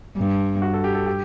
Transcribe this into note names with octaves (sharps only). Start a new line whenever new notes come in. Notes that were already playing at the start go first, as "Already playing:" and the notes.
G2
F#4
A4
G4
A4
G4